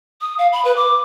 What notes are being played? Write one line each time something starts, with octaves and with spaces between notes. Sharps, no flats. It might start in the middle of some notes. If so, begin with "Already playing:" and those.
D#6
F5
B5
B4
D6